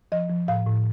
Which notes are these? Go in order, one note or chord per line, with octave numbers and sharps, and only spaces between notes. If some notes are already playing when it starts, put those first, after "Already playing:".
F3 D#5
F3
A2 F5
A2